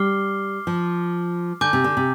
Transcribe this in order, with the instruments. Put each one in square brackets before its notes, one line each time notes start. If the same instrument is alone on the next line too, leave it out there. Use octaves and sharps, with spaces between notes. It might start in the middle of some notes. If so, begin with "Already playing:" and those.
Already playing: [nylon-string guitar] G3 [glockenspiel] D6 F6 C7 G7
[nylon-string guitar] F3
[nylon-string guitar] D3 [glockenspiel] G#5 D6 G6
[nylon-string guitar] C3
D3
C3